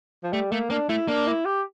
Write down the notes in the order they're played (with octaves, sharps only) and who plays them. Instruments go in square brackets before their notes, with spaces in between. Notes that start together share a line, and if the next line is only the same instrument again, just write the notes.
[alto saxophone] F3
[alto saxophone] G3 [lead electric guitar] A3
[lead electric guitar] A3 [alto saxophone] A#3
[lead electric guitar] A#3 [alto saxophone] D4
[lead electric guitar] A3 [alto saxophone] E4
[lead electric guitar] A#3 [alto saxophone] D4
[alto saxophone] E4
G4